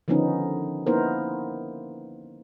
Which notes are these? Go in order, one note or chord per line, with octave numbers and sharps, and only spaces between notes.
D3 D#3 F3 B3 C#4 D#4
A#3 B3 D#4 E4 A#4 C5